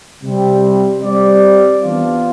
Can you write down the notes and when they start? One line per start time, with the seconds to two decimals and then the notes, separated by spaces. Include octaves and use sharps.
0.23 C3 G3 C4
1.02 G3 C4 G4 D5
1.82 E3 B3 D4 F4